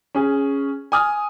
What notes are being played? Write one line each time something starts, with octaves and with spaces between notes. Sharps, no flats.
C#4 G#4
G#5 D#6 F6